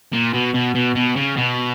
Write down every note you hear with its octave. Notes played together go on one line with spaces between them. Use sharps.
A#2
B2
B2
B2
B2
C#3
B2